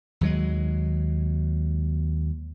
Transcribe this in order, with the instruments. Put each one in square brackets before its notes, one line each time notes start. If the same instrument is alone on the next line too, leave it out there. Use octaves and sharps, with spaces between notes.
[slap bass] D#2 F#3 G#3